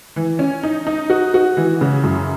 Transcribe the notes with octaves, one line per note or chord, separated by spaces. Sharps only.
E3
C#4
D#4
D#4
F#4
F#4
E3
C#3
F#2